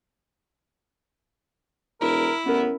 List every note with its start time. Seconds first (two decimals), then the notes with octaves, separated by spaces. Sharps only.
2.01 E1 E4 A#4
2.46 A1 B3 C#4 A#4